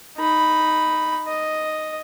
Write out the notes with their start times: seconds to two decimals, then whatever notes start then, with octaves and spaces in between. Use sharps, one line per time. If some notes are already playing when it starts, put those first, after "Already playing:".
0.17 D#4 B5
1.27 D#5